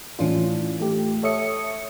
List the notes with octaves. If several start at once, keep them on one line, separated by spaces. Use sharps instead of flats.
A2 E3 C#4 D4 F4
A3 G4
A4 C#5 E5 D#6 C#7